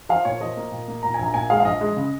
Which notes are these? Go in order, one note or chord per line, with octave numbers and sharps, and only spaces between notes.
F3 F5
A#2 C#5
F3 D#5
A#3
A#2
A#3
A#2 A#5
A#1 G#5
A#5
A#2 G#5
G#3 F5
F5
A#1 D#5
G#3
C#3